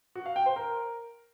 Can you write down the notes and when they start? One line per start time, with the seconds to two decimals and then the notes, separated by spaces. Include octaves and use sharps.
0.15 F#4
0.26 F5
0.36 G5
0.46 C5
0.56 A#4